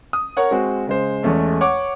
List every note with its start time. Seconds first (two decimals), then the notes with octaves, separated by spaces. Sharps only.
0.13 D#6
0.37 A#4 C#5 F#5
0.51 G#3 C4 F#4
0.87 C#3 G#3 C5
1.23 E2 G#3 A3 C#4
1.61 C#5 F#5 D6